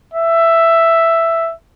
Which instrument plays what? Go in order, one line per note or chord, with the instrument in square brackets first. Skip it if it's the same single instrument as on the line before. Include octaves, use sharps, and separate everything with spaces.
[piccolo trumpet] E5